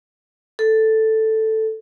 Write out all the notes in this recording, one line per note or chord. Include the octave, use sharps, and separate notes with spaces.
A4